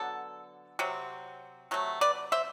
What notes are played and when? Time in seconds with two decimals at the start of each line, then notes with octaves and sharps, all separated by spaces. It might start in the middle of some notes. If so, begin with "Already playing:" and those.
Already playing: D3 F#3 B3 A4
0.79 C3 F#3 C4
1.71 C3 F#3 A3
2.01 B4 D5
2.32 C5 E5